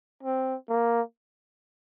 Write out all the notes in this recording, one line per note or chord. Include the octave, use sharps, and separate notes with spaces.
C4
A#3